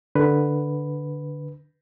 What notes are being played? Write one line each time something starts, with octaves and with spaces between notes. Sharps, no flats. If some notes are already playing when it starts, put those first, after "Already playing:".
D3 B4